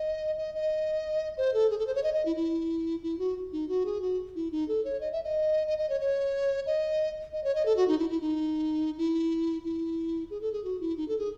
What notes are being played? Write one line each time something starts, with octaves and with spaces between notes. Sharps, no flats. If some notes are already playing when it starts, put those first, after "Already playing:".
Already playing: D#5
D#5
D#5
C5
A4
G#4
A4
C5
C#5
D#5
D#5
E4
E4
E4
F#4
D#4
F#4
G#4
F#4
E4
D#4
A4
C#5
D#5
E5
D#5
D#5
D#5
C#5
C#5
D#5
D#5
C#5
D#5
A4
F#4
D#4
E4
E4
D#4
E4
E4
G#4
A4
G#4
F#4
E4
D#4
A4
G#4